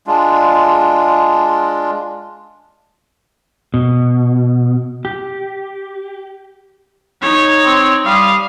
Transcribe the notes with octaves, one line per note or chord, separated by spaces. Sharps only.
G#3 D4 F4
B2
G4
D#4 C#5
C4
G3 F5 D#6